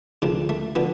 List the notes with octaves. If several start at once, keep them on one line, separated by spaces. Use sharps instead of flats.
D2 C#3 F3
A3
D3 F3 B3